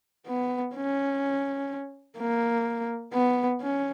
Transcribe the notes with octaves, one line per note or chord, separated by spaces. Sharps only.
B3
C#4
A#3
B3
C#4